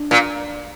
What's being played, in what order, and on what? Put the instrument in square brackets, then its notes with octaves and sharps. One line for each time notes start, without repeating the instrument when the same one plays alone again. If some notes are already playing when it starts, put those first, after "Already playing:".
Already playing: [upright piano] D4
[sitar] A#2